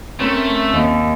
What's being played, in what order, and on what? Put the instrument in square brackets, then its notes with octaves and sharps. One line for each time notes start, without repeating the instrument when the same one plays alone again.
[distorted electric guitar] A3 [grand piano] C4 C#4 A#4
[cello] D#2